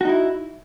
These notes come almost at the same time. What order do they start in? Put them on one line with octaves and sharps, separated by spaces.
F#4 D#4 E4